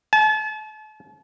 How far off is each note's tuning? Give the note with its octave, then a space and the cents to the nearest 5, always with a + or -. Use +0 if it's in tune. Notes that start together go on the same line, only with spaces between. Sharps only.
A5 -40